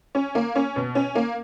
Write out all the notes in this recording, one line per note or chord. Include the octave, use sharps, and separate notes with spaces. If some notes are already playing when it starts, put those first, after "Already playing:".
C#4
A#3
C#4
B2
C#4
A#3